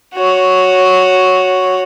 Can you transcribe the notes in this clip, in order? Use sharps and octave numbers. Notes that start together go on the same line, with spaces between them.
F#4 C#5